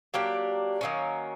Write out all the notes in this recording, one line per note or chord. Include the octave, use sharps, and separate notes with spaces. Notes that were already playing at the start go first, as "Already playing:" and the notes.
F#3 A#3 D4 G4
D#3 F#3 A#3 C#4